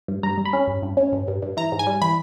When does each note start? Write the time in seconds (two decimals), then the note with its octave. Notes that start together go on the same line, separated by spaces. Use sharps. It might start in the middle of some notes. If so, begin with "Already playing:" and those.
0.08 G2
0.23 G2 A#5
0.38 G3
0.45 B5
0.53 C#4
0.67 G2
0.82 G2
0.97 C#4
1.12 G2
1.28 G2
1.42 G2
1.57 E3 A#5
1.72 G#2
1.79 G#5
1.87 G3
2.02 E3 B5